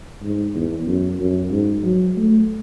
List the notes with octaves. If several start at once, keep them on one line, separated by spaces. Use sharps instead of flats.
G#2
E2
F#2
F#2
G#2
F#3
A3